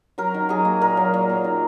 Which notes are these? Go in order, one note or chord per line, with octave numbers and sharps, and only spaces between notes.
F#3 A#4
D#3
F#3 G#4
A#3
A#2 A#4
F#3
A#2
A#2
D#3